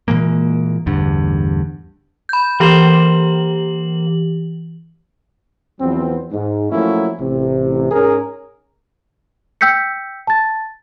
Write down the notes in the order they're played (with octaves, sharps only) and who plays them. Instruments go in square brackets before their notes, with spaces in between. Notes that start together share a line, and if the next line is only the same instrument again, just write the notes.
[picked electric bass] A#2 E3 G#3 A#3
A1 E2 G2 D3
[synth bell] B5 G6
[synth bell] E3 G4 F#7 [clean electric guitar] A#3 C5
[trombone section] E2 F3 F#3 B3 C4
G#2
F3 F#3 A3 A#3 C#4 E4
A1 C3
G#2 C#4 G#4 A#4
[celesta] G5 E6 G6 B6 C#7
A5 A6